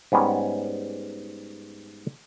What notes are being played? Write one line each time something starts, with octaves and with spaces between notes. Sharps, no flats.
G#2 G3 B3 C#4